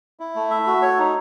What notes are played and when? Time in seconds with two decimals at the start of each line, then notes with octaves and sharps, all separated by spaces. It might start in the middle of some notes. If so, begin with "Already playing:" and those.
0.20 E4
0.35 A3
0.51 E5
0.67 F#4
0.82 C#5
0.98 D#4